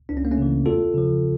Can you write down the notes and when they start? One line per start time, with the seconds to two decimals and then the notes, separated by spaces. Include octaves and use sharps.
0.09 C#2 D4
0.17 C#4
0.25 A#3
0.31 A3 C#4
0.38 C#3 E3
0.66 E2 F4 A4
0.94 C#3 F3